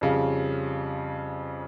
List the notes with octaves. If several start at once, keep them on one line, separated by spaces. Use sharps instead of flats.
F2 C#3 G3 C#4 F4